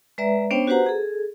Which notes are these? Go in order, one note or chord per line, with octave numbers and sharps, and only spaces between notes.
G#3 B4 D5 E5 A#5
B3 C#4 D4 C5 C#5 G5
F#4 G4 B4 C5 F#5 A#5
G#4 A4